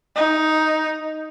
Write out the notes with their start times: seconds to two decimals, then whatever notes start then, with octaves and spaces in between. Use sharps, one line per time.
0.16 D#4